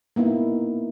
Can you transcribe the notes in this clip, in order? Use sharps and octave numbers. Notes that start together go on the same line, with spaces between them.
A#3 B3 D#4 E4